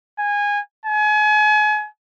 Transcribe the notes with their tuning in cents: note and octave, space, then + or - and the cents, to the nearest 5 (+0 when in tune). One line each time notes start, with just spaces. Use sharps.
G#5 -20
G#5 +35